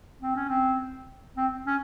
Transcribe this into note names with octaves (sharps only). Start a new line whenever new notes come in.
C4
C#4
C4
C4
C#4